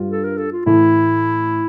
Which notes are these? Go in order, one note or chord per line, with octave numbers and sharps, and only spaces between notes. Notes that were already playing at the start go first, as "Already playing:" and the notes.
Already playing: G2 G3 F4
A4
A#4
A4
F4
A2 E3 A3 E4